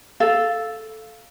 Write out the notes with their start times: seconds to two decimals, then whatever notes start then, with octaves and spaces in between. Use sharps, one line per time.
0.20 A4 F5